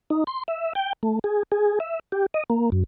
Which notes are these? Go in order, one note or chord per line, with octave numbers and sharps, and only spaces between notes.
D#4
C6
E5
G5
A3
G#4
G#4
E5
G4
D#5
A#3
F#2